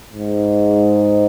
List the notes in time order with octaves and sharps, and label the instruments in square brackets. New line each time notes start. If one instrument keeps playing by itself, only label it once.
[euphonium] G#2